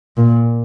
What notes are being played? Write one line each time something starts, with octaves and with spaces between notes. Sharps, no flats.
A#2